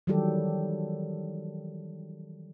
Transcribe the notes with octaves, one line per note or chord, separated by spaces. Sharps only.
D#3 E3 F#3 G3 G4 A4